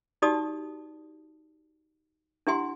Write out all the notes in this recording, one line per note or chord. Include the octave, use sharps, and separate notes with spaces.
D#4 F#4 G4 D5 A5 D#6
D4 E4 G4 F#5 G#5 C6